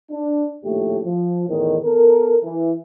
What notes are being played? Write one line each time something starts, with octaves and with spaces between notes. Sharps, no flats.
D4
A#1 D#2 A2 A3 G4
F3
E2 A2 D#3
B3 A4 A#4
E3